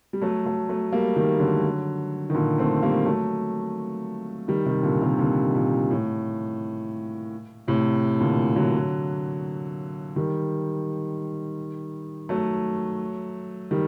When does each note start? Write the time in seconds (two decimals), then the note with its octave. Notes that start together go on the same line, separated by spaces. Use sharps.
0.13 G3
0.22 F#3 A3
0.45 F#3 A3
0.69 F#3 A3
0.92 G3 A#3
1.16 D#3 G3
1.40 D3 F#3
2.30 D#3
2.34 A#2 D3
2.58 A3 C4
2.82 G3 A#3
3.06 F#3 A3
4.48 D#3 G3
4.66 C3 D#3
4.83 A#2 D3
5.02 C3 D#3
5.19 A#2 D3
5.55 A#2
5.91 A2
7.68 A2 C3
8.21 A#2 D3
8.56 D3 F#3
10.16 D#3 G3
12.29 F#3 A3
13.71 D#3 G3